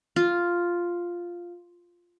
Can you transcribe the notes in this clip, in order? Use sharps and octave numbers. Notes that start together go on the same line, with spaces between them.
F4